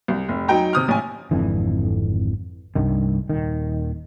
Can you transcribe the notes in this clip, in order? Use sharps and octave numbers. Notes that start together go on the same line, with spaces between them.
C2
F1
F#3 D#4 G5 A#5
C3 D#6 F6
A1 G#5
G#1 F2 D3 E3
C2 G2 D#3
D#1 D#3